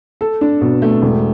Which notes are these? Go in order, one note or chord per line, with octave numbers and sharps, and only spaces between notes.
A4
D4
B2
A3
E1